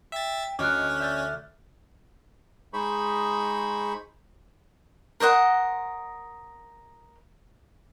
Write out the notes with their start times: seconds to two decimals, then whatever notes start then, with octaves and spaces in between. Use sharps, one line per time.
0.12 E5 G5 A6
0.59 D2 C#4 D4 F#4 D#5 D6 F6 F#6
1.00 D5 E5 G6 A6
2.73 G#3 D#4 G#4 C5 B5 C#6
5.20 A#4 C5 D#5 F#5